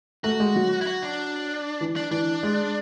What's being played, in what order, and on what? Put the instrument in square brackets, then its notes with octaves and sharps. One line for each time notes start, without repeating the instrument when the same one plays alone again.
[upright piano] A3 [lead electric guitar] F#4
[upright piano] G#3
F#3
[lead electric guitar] E4
F#4
D4
[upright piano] E3
[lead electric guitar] D4
[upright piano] E3 [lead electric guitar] D4
[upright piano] G#3